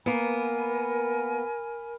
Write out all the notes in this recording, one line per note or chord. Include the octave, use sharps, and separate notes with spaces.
A#3 B3 A#4 G#5 B5